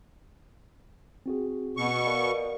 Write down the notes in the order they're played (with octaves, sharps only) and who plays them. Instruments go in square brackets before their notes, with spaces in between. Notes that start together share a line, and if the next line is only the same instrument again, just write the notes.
[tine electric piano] C4 F#4 G#4
[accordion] B2 C#6
[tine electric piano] A#4 D5 F5